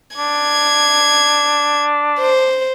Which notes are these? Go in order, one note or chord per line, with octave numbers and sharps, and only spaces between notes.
D4 G#6
C5